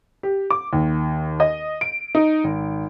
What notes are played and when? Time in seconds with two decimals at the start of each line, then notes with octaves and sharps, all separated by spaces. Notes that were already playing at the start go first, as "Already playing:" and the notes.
0.23 G4
0.51 D6
0.73 D#2
1.40 D#5
1.81 D7
2.15 D#4
2.44 G#1